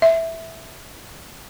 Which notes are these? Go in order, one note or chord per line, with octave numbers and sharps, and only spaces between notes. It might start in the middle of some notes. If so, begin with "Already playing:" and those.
E5